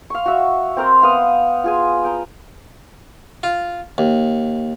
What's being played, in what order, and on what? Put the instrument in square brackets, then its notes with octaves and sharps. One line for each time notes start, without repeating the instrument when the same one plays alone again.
[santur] F5 C#6
F#4 E5
C4 A#4 C5 G5
B3 F5 D#6
F4 G#4 G#5
G5 A#5
[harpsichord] F4
D#2